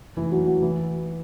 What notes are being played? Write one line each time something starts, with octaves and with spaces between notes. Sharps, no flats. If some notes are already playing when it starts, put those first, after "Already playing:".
E3 E4
F#3 F#4
F#3 F#4
E3 E4